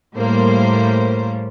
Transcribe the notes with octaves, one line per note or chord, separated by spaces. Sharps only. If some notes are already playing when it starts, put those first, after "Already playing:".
A2 G3 A#3 C5